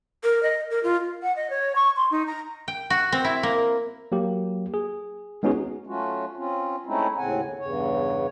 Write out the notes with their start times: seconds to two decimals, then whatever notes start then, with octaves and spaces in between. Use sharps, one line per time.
0.24 A#4
0.43 D#5
0.71 A#4
0.83 F4
1.22 F#5
1.36 D#5
1.50 C#5
1.75 C#6
1.96 C6
2.11 D#4
2.27 A#5
2.68 G5
2.90 F#4
3.12 C4
3.24 E4
3.43 A#3
4.12 F#3 A#3 G4
4.74 G#4
5.43 G#3 B3 C#4 D#4 F#4 G#4
5.87 F#3 A3 C#4 F4 F#4
6.37 C4 C#4 F4
6.86 G#3 A3 C4 C#4 D#4 E4
7.17 D#2 A2 C#3 C4 F#5 G#5
7.42 D3
7.59 E2 G2 C#3 C#5